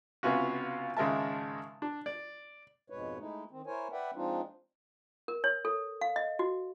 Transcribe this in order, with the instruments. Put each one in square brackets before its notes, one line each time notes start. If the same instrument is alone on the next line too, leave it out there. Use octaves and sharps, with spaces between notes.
[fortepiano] C#2 C3 B3 C#4 F4 F#4
G#1 C#3 G#3 A#4 E5 A5
D4
D5
[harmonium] F2 G#2 B2 G#3 B4 C#5
G#3 A3 D#4 E4
D#3 C4
E4 A#4 C5 C#5 G#5
B4 D5 E5 F#5 G5
F3 G#3 C4 D4 D#4 F4
[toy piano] A#4
C#5
A4
F5
D#5
F#4